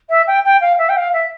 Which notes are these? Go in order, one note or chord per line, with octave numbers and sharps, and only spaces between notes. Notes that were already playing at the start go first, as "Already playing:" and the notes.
E5
G5
G5
F5
E5
G5
F5
E5